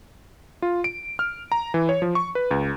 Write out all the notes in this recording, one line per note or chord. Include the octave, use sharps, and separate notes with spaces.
F4
D7
F6
A#5
E3
C#5
F3
C#6
B4
C#2